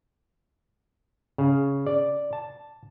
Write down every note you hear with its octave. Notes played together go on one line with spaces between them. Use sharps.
C#3
D5
A5